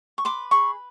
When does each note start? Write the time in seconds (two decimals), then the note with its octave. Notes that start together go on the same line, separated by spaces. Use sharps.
0.18 C#6
0.25 B4 C6 D6
0.51 G#4 B5 C#6